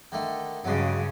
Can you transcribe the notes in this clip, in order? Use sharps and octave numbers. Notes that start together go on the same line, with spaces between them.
D3 D#3 A3
G2 C#3 F#3 G#3